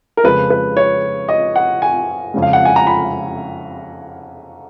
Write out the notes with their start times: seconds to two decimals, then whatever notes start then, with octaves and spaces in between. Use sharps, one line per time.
0.17 A#4
0.24 F2 C#3 G#3 B4
0.50 B4
0.77 C#5
1.29 D#5
1.56 F#5
1.82 G#5
2.34 F2 C#3 G#3
2.42 F5
2.53 F#5
2.65 G#5
2.76 A#5
2.87 B5